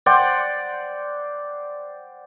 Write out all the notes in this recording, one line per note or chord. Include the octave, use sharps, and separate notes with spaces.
C5 D5 F#5 G5